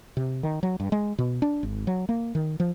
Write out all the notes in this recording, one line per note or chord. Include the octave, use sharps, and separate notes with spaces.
C3
D#3
F#3
G2
G#3
B2
D4
G#1
F#3
A#3
D#3
F3